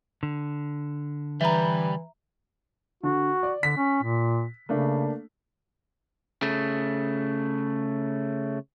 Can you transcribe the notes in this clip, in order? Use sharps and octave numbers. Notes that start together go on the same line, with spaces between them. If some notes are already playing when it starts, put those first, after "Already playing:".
D3
E3 G3 B4 E5 A#5
D3 F#4
D5
D3 B6
C#4
A#2
C#3 A3 A#3 D4
C#3 A3